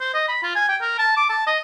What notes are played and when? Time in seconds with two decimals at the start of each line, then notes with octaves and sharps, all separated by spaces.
0.01 C5
0.14 D#5
0.28 B5
0.43 F4
0.55 G#5
0.69 G5
0.81 A#4
0.99 A5
1.17 D6
1.29 A5
1.47 D#5